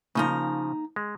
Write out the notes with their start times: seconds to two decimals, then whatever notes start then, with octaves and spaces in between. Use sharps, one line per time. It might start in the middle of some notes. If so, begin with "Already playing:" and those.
0.15 C#3 F3 A#3 D#4 A#5
0.96 G#3